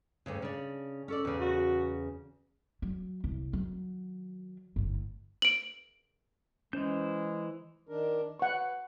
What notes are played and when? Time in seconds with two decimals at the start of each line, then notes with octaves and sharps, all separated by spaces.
0.26 D2 G2 C#3
0.42 C#3 D4
1.08 C#4 A4 D5
1.25 E2 C#3
1.40 F#4
2.82 F#3
3.24 C2
3.53 D#3 F#3
4.76 G1 A2
5.42 D7 F#7
6.73 E3 G#3 C#4 C5 G6
7.89 D#3 D4 A#4
8.39 B4 F#5 C#6